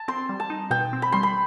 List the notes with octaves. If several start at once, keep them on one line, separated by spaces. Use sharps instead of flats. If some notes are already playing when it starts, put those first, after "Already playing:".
Already playing: A5
C4 C6
G3
A5
D#4
B2 G5
C4
B5
G3 C6
B5